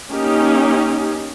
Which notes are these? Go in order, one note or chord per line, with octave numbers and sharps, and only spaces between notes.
A#3 C#4 D#4 G4